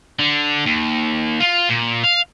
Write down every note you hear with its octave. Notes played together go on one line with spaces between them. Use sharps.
D3
D#2
F4
A#2
F5